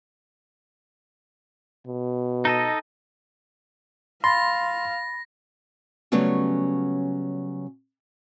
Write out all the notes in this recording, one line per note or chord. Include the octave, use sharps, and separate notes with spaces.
B2
D#4 A4 D#5
F5 B5 C6 A6 A#6
C#3 F#3 G3 A3 B3 C#4